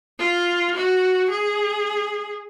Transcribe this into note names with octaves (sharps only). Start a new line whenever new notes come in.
F4
F#4
G#4